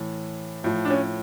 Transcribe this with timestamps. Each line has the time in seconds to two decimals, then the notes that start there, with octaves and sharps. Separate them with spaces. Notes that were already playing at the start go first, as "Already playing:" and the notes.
Already playing: A2 E3
0.64 A2 F3
0.85 D4
0.90 C#4